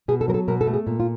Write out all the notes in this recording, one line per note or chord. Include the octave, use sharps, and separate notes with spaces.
B2 G#4
A4
F#3 A#4
A4
B2 A#4
A4
A3
G#4
A#2
F4